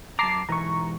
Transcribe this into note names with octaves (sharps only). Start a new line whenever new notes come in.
F#2 A5 A#5 D6 C7
G#2 B2 E3 A#5 C#6